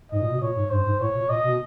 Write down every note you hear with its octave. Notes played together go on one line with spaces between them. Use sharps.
G#2 D#5
A#2
B2
A#2 C#5
G#2
G2 C5
G#2
A2 C#5
A#2
A#2 D#5
B2